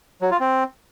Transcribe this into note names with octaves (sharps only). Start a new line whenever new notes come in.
F#3
F4
C4